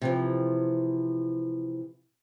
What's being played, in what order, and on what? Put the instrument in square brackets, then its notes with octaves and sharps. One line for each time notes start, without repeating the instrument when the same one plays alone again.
[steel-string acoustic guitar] C3 E3 F3